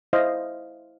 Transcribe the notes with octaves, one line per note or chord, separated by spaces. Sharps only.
E4 C5 D#5 F5